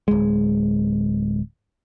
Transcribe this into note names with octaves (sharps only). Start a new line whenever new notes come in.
D1 G#3